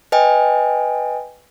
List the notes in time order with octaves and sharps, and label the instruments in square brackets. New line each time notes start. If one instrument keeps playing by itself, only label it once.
[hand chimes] B4 D#5 G5 G#5